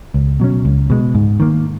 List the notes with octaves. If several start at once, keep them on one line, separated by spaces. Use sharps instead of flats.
C#2
B2 F#3 C#4
C#2
B2 G#3
G#2
D#3 A#3